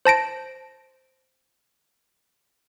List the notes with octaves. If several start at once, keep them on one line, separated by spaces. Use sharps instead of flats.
C5 A5 A#6 D7